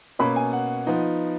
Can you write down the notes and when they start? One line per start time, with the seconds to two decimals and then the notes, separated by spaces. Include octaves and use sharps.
0.19 B2 A#3 C#4 B5
0.36 G#5
0.53 F#5
0.87 F3 B3 D#4